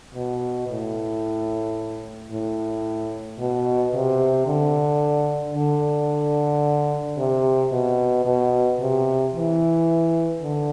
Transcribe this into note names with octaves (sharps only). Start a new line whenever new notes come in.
B2
A2
A2
B2
C3
D3
D3
C3
B2
B2
C3
E3
D3